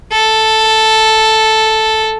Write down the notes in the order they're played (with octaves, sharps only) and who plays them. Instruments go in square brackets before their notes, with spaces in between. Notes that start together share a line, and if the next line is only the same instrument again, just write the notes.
[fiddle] A4